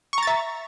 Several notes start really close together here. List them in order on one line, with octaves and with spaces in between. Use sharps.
C#6 A#5 A6 E5